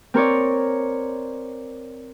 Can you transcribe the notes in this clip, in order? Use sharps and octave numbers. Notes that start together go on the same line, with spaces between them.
C4 A#4 C#5 D5